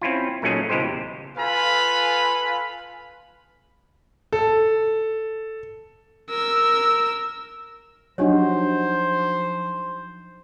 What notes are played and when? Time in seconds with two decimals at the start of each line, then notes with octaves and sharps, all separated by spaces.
0.02 C4 C#4 E4 F4
0.42 A#2 F#3 A3 C#4 D#4 G#4
0.70 C#2 B2 E3 G#3 G4 C5
1.37 F4 A4 B4 F5 G#5 B5
4.33 A4
6.30 A#4 E6
8.18 F3 F#3 D4 D#4 F#4 G4 C5 C#5